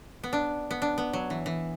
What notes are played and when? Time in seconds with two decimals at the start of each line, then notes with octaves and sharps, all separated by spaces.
0.23 B3
0.33 D4
0.71 B3
0.82 D4
0.98 B3
1.13 F#3
1.30 E3
1.46 E3